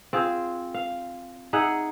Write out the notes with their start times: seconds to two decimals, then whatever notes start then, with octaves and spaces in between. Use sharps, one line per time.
0.13 C4 F4 G#4 C5
0.74 F5
1.53 D#4 G#4 E5 F#5